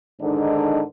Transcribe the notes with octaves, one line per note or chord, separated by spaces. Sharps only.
G#2 D3 D#3 D4